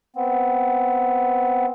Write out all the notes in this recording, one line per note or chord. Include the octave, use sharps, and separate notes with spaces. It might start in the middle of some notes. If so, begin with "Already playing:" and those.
B3 C4